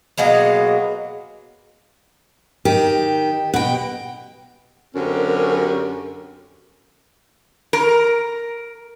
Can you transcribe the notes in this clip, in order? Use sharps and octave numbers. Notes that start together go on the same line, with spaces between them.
B2 F#3 G#3 A#3
D#3 G4
B2 F#5 G5
F#2 D3 C4 C#4 G4 A#4
A#4